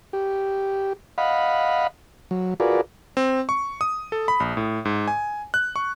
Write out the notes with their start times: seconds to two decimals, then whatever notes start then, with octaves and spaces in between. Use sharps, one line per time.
0.13 G4
1.18 D#5 F5 F#5 B5
2.31 F#3
2.60 F4 F#4 G#4 A#4 B4 D5
3.17 C4
3.49 C#6
3.81 D#6
4.12 A4
4.28 B5
4.40 A#1
4.57 A2
4.85 G#2
5.08 G#5
5.54 F#6
5.76 C#6